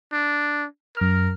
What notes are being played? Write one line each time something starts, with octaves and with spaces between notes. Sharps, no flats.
D4
F#2 A#4 F6